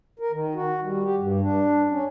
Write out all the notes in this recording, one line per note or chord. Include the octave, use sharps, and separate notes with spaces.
A#4
D#3
F#4
G3
G4
G2
D4
C#4